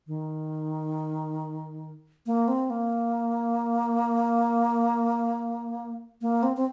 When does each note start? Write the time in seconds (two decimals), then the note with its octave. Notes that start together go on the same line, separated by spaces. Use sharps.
0.07 D#3
2.26 A#3
2.48 C4
2.70 A#3
6.22 A#3
6.43 C4
6.57 C4